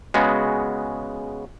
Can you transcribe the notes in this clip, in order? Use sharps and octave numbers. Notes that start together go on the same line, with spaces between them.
C#3 G#3 B3 F#4